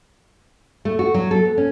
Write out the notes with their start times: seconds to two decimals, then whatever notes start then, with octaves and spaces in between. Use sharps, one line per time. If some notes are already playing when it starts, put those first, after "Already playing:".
0.85 A3
0.99 F#4
1.14 F#3
1.31 A4
1.45 B3
1.58 C#4